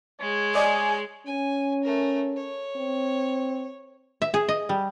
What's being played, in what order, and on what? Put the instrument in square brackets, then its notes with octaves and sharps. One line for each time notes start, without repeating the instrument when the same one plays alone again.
[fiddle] G#3 [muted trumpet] C#5
[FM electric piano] G#4 D5 D#5 [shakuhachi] G#5
[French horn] C#4 [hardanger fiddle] G#5
[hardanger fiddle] A3 A#4
C#5
[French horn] C4
[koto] E5
G#4
D#5
G3